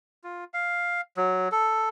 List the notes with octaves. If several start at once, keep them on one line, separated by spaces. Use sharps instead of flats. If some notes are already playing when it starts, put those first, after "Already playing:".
F4
F5
F#3
A4